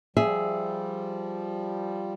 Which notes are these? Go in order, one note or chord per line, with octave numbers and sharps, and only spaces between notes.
F3 G3 G#4 E5